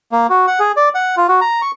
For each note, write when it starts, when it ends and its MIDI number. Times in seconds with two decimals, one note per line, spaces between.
0.12 0.27 58
0.30 0.46 66
0.47 0.59 78
0.60 0.72 68
0.77 0.89 74
0.95 1.15 78
1.17 1.27 65
1.29 1.40 66
1.41 1.61 82
1.62 1.71 85